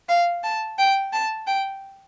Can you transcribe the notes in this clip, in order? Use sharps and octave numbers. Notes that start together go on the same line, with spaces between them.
F5
A5
G5
A5
G5